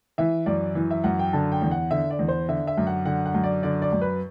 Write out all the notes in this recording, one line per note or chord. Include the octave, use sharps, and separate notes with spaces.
E3 E5
F#2 D5
E3
E5
F#2 F#5
G5
D3 A5
G5
E2
F#5
D3 E5
D5
E2
C5
D3 E5
E5
F#2
F#5
D3 F#5
F#5
F#2
D5
D3 D5
D5
F#2
B4